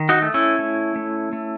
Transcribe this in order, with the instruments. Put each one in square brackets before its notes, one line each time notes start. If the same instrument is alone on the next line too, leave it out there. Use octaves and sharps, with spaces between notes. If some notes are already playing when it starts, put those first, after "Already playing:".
Already playing: [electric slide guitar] D#3
D#4 F#4
A3
C#4 E4
A3
A3
A3